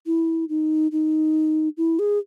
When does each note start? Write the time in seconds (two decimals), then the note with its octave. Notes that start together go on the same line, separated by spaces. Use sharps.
0.06 E4
0.49 D#4
0.92 D#4
1.77 E4
1.99 G#4